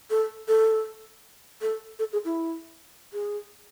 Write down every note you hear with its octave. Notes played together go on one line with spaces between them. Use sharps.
A4
A4
A4
A4
G#4
E4
G#4